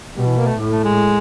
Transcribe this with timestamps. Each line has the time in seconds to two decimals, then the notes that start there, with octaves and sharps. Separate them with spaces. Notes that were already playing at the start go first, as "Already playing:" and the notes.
0.16 B2 G3
0.27 E3
0.37 A#3
0.47 A3
0.58 A2
0.71 A3
0.84 G#3